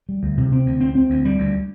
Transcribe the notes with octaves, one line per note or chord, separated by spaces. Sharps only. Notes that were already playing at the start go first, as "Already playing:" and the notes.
G3
D2
C3
C4
D2
C4
C4
D2
G3
D2